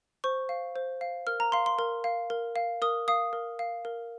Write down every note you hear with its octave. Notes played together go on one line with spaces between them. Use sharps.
C5 C#6
F5
C5
F5
A#4 F6
A#5
F5 C6
C6
A#4
F5
A#4
F5
A#4 D#6
F5 D#6
A#4
F5
A#4